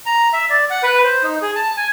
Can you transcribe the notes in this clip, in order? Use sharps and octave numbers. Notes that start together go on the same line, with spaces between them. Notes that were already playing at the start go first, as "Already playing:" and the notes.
A#5
E5
D5
F#5
B4
C5
D#4
G#4
A5
G#5